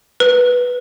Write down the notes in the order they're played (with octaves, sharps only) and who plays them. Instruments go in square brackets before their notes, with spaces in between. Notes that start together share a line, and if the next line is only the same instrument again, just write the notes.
[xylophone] B4